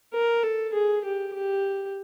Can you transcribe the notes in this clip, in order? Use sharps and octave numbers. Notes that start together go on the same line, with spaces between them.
A#4
A4
G#4
G4
G4